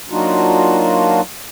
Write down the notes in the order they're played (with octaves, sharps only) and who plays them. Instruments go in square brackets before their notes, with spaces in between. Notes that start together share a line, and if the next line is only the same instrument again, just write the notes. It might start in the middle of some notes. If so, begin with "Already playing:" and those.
[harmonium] F#3 A#3 D4 D#4 F4 F#4